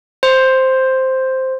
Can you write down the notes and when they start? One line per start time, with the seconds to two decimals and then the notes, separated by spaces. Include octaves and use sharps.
0.23 C5